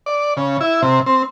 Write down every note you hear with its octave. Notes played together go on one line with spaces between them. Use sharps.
D5
C#3
E4
C3
C4